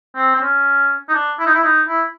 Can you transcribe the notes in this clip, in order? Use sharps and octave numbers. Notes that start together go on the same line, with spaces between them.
C4
C4
C#4
D#4
D4
E4
D#4
E4
D#4
E4